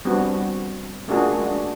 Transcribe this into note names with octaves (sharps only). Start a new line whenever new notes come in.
G3 B3 C4 D4 F#4
A3 A#3 D4 F4 F#4 G#4
G#3 D4